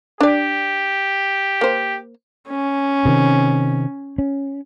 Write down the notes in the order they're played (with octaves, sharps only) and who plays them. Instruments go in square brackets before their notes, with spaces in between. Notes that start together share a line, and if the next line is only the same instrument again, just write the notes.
[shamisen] D4 D5 [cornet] G4
[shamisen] A#3 C5
[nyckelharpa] C#4
[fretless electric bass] C3 D#3
C#4